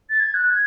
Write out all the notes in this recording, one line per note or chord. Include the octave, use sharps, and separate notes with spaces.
A6
G#6
F#6
G#6